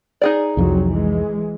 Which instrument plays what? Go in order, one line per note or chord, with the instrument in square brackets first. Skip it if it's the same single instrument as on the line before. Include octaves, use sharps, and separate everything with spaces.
[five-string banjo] D#4 G#4 D5
[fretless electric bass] C2 F2 [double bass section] F#3 C4
[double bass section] E3 G#3